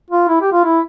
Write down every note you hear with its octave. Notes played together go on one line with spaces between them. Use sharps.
F4
E4
G4
F4
E4